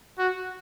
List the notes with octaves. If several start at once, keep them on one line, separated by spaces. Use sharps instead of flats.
F#4